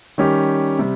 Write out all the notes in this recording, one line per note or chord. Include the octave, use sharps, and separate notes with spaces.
D#3 G3 C#4 G4
C3 G3